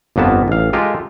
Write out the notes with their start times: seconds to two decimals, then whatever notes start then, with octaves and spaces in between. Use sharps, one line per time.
0.16 G1 F2 A#3 B3 A5
0.48 A1 F5
0.73 G#3 F4 G4 A4 A#4